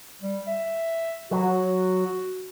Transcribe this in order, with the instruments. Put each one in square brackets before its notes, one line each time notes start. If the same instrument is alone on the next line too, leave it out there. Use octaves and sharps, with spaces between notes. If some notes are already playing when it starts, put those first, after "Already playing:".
[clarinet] G3
E5
[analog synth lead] F#3 [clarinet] F#4